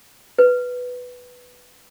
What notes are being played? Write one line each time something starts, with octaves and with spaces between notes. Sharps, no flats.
B4